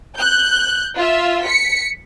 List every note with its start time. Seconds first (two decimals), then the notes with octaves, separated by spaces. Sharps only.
0.15 F#6 G6
0.96 F4 E5
1.44 B6 C#7